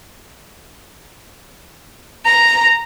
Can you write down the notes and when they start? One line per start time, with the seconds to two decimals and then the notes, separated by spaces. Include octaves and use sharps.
2.24 A#5